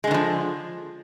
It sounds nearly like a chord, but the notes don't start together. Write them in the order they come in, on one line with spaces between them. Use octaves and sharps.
G#3 D3 D#3 F3